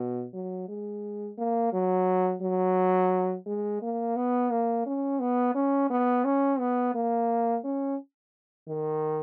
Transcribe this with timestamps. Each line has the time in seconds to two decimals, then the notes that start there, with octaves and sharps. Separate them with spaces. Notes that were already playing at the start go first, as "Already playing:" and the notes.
Already playing: B2
0.33 F#3
0.68 G#3
1.38 A#3
1.73 F#3
2.42 F#3
3.46 G#3
3.82 A#3
4.16 B3
4.51 A#3
4.86 C#4
5.20 B3
5.55 C#4
5.90 B3
6.25 C#4
6.59 B3
6.95 A#3
7.64 C#4
8.68 D#3